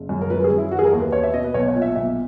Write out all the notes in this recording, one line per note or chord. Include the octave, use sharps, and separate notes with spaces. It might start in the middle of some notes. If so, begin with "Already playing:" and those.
Already playing: F#1
F#2
A#4
F#3 B4
G#4
F#2
E4
E3 F#4
G#4
A#4
D#2
B4
B3 C#5
E5
B2 D#5
B4
B1 C#5
C#5
A#2
E5
B1 E5